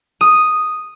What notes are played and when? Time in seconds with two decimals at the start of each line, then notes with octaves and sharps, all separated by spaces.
0.21 D#6